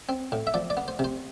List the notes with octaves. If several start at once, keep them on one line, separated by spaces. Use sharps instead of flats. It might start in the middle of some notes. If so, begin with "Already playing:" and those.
C4
A2
E5
F3 D5
D5
B3
C5
C3
C5